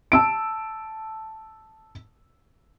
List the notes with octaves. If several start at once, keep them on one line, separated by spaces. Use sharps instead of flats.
A5 E6 D7